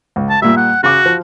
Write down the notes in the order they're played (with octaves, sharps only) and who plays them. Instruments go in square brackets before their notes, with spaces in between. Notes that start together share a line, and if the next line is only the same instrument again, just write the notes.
[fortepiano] C#2
[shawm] A5
[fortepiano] A#2 G3 [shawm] E5
[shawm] F#5
[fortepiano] C#3 D6 [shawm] F#4
[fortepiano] F3